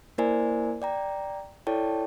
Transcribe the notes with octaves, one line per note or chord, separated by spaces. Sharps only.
A#3 E4 A#4 C5 D5 G#5
D5 G5 A#5
E4 A4 C#5 D5 G5 A5